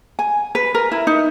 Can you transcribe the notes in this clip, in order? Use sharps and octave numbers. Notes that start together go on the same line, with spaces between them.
G#5
B4
A#4
E4
D#4